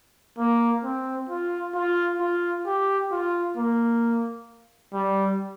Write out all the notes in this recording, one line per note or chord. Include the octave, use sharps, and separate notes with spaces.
A#3
C4
F4
F4
F4
G4
F4
A#3
G3